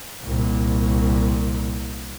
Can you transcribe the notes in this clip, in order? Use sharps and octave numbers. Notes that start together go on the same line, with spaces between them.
C2 A#2